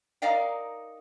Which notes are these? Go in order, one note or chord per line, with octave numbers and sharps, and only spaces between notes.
D#4 A#4 D5 F5 G5